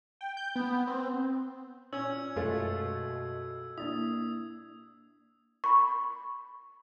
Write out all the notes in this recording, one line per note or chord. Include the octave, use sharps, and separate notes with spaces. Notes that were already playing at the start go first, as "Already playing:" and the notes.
G5
G6
B3
C4
A#2 C#4 C#5 G#5 E6 G#6
F#2 B2 G#3 A3 F4
A#3 D4 E4 D#6
B5 C#6